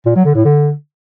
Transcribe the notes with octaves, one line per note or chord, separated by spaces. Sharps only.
A#2
F#3
D3
A2
D3